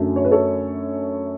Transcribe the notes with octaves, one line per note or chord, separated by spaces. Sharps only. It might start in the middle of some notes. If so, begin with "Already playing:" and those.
Already playing: F#2 D3 F#3 A3
C#5
B4
A4 C#5